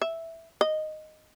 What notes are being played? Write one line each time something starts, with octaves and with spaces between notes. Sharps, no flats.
E5
D#5